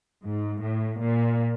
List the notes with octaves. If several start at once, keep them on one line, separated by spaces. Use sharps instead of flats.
G#2
A2
A#2